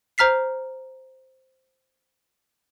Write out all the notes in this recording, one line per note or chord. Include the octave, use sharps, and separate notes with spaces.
C5 A#5 F6 B6 C7